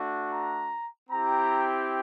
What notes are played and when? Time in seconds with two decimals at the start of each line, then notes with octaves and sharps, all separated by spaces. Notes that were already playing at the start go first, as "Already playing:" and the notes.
Already playing: A3 D4 F#4
0.31 A#5
1.09 C4 E4 G4 A#5